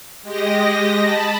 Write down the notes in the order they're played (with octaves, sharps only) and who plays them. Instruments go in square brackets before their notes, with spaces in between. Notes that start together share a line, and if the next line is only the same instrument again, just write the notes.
[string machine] G#3 G4 D#5 A#6
A5 B5